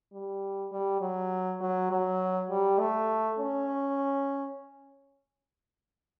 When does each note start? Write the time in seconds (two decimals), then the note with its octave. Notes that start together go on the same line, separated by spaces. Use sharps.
0.13 G3
0.72 G3
1.01 F#3
1.61 F#3
1.91 F#3
2.50 G3
2.80 A3
3.39 C#4